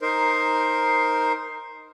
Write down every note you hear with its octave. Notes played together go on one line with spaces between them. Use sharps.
D#4 A#4 C5